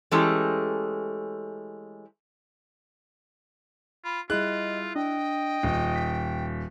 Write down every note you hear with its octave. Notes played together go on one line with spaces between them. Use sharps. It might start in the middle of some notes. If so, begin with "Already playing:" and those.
E3 G#3 A3 C#4 G4 A4
F4 B5
G3 E4 F4 G#4 D#5 F#6
D4 D#5 G5
D#1
B6